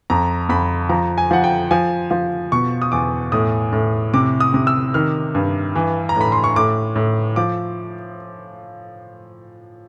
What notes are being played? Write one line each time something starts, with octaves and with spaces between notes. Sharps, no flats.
F2 A#5
F2 B5
F3 A#5
G#5
F3 F#5
G5
F3 G#5
F3
B2 C#6
D#6
E2 D6
A2 D#6
A2
C3 D6
D#6
C3
E6
D#3 F6
G2
E3
A#5
A2 B5
C6
C#6
A2 D6
A2
F3 D6